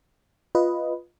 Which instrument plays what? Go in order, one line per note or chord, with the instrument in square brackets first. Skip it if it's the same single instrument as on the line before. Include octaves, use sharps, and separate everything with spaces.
[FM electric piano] F4 B4 D#5